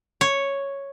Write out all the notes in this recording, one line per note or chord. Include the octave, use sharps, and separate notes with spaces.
C#5